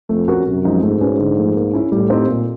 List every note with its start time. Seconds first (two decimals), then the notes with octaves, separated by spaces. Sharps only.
0.09 F2 A3
0.28 C#4 F#4 A#4
0.46 F#2 C3
0.65 F3 G#3 C4 D#4
0.83 G#2 A3
1.01 C#4 F#4 B4
1.19 D3
1.37 F3 A3
1.56 A#3
1.73 C#4 E4
1.92 A2 G3
2.10 C4 D#4 G4 C5
2.28 A#2